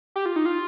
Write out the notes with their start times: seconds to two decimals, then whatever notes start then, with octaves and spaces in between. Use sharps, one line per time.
0.16 G4
0.26 F4
0.36 D#4
0.46 F4